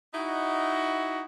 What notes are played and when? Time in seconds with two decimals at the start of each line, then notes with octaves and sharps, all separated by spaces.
0.14 D#4 E4 F#4